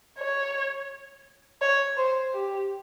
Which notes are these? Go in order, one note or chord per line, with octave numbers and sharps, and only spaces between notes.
C#5
C#5
C5
G4